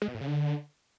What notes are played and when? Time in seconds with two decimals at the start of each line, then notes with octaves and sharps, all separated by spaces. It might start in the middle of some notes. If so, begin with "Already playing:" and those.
0.02 G#3
0.08 B2
0.15 A2
0.21 C#3
0.27 D3